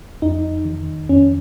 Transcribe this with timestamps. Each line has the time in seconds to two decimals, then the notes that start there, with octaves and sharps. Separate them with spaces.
0.22 F2 D#4
0.65 D#3
1.09 F2 C#4